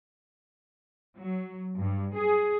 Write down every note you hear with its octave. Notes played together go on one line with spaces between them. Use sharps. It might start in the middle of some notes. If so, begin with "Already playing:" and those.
F#3
G2
G#4